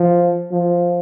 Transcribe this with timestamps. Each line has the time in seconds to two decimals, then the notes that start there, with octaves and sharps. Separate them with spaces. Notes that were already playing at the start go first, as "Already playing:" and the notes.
Already playing: F3
0.52 F3